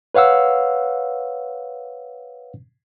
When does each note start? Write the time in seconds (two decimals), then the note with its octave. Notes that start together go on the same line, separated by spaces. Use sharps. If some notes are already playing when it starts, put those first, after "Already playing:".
0.15 B4 C#5 F5 F#5 E6